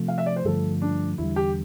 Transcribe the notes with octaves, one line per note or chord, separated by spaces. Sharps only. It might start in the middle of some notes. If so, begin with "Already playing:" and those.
Already playing: C3 F3 A3
F5
E5
D5
C5
G2 D3 F3 A3 A4
D4
E2 D3 G3 E4
G4